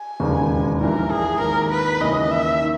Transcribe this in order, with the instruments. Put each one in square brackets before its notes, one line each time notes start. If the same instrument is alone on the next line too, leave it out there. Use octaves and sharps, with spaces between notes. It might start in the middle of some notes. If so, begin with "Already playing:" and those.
Already playing: [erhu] G#5
[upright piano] E1 D#2 C#3
[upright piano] A#1 G#2 E3 G3 [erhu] A#4
[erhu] G#4
[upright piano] G#1 G#2 D#3 A#3 [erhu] A#4
[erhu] B4
[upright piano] D#2 C#3 E3 A#3 C#4 [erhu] D#5
[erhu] E5
[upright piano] D#3